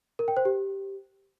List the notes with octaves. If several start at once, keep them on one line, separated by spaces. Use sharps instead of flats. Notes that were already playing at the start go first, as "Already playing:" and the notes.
A#4
G5
C5
G4